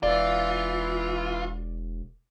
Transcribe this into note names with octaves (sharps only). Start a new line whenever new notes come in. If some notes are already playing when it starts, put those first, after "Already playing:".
E1 E3 F4 D5